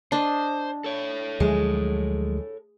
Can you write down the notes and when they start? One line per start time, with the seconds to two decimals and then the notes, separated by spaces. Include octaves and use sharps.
0.12 D4 C5 D#5
0.84 A4 C#5
1.40 D2 F3 F#3 G#3